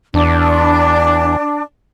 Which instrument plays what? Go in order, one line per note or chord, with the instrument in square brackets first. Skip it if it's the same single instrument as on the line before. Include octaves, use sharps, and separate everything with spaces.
[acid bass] E2 [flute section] D4